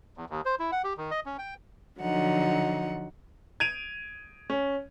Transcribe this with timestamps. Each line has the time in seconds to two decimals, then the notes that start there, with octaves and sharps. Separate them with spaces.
0.17 E2
0.30 D#2
0.45 C5
0.59 E4
0.72 F#5
0.84 G4
0.97 D#3
1.11 D#5
1.26 C#4
1.38 G5
2.00 D3 F3 F#3 D#4 F#5
3.60 G#6 D7 D#7 F7
4.50 C#4